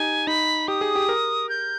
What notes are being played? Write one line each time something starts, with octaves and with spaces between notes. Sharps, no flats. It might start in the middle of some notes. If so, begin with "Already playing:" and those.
Already playing: D#4 G4 G#5
D#4 B5
G4 D#6
G#4
G4
A#4
G6